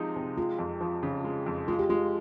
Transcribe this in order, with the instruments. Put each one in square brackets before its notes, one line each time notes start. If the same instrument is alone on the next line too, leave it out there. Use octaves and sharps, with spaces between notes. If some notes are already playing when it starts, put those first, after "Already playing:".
Already playing: [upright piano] C3 F3 G#3 D#4
C3
[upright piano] G#3 [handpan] F4
[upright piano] F2
F3
C#3
G#3
F2
[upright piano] G#3 [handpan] F4
[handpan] G4
[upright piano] G#3 [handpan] F4